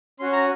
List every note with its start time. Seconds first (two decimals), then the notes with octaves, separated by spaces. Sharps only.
0.19 C#4 F#4 C6
0.32 A#5